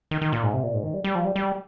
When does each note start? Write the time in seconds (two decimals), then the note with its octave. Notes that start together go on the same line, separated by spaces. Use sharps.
0.11 D#3
0.21 D#3
0.32 A#2
0.43 G#2
0.54 C3
0.63 A#2
0.74 G#2
0.84 D#3
0.94 G3
1.04 G3
1.15 F3
1.25 G3
1.36 G3